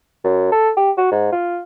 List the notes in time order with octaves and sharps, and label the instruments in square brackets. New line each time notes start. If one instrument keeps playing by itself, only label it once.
[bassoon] F#2
A4
G4
F#4
G#2
F4